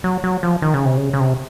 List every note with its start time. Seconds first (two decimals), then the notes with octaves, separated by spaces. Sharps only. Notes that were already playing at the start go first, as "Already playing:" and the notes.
0.04 F#3
0.24 F#3
0.43 F3
0.62 D#3
0.74 C#3
0.85 C3
0.97 C#3
1.13 C#3
1.20 C3